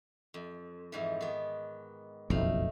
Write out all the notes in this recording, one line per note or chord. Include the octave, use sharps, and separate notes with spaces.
F2
F2 G#2 E3
D#3 B3
F#1 B1 F2 A3 D#4 F5